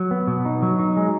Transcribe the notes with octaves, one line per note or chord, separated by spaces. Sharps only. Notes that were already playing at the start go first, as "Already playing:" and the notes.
Already playing: F#3
B3
B2
D#4
F#3
D#4
G#3